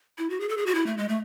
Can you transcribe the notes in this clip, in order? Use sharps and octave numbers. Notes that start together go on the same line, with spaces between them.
E4
F#4
G#4
A4
G#4
F#4
E4
A3
G#3
A3